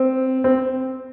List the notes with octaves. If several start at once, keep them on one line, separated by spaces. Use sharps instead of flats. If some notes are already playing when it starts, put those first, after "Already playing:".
Already playing: C4
C4